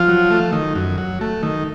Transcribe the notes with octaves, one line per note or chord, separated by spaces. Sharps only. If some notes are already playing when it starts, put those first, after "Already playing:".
Already playing: F3 F4
F#3
A3
D#3
F#2
F#3
A3
D#3